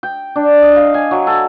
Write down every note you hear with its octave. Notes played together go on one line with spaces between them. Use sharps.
G5
D4
D#5
F5
G#5
F#3
A4